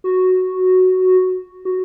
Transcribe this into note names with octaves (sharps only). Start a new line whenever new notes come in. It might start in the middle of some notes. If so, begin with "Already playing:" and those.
F#4
F#4